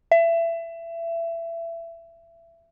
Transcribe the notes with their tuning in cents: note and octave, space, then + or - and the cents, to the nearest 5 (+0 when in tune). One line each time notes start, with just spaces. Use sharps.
E5 +25